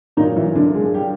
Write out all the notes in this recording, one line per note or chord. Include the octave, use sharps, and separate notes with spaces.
A#2 D#3 F#3 D#4
E3 E4
D3 D4
G#3 G#4
G3 G4